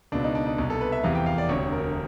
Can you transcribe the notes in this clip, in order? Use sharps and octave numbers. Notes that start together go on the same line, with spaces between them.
C#2 B2 D4
D#4
D4
D#4
C2 B2
A4
B4
E5
F1 E2 C3 E3 F5
G5
F5
D5
E1 D2 C3 C#5
A#4